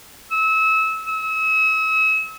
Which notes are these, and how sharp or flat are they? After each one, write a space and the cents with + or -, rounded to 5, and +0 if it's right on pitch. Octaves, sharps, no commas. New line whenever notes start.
E6 -30
E6 -40